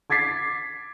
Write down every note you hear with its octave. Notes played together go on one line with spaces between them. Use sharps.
D6 G#6 A6 B6 C7